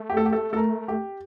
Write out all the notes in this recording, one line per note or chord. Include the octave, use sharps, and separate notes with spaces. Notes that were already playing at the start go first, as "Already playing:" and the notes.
Already playing: A3
G4
A4
G4
A4
A4
A#4
G4